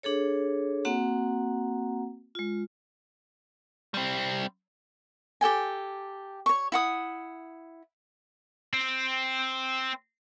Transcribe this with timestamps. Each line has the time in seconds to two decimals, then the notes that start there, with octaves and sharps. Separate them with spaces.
0.03 D4 G#4 A4 C#5
0.85 A#3 C4 F#4 F#5 A#5
2.35 G#3 F4
3.94 G3 C4
5.41 G4 A4 G5 G#5
6.46 C#5 C#6
6.72 E4 F#5 D#6
8.74 C4